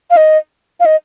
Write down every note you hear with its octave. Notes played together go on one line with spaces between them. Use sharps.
F5
D#5
F5
D#5